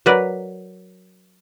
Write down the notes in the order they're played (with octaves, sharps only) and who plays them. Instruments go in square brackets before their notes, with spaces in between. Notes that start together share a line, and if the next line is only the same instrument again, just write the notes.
[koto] F#3 A#4 B4 D5